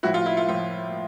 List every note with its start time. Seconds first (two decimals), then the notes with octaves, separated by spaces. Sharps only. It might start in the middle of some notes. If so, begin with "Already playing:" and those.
0.03 A2 F3 E4 F#4
0.14 F4
0.26 E4
0.37 F4
0.48 A2 F3 F4